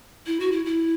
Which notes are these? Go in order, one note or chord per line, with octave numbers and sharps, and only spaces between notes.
E4
F#4
E4
E4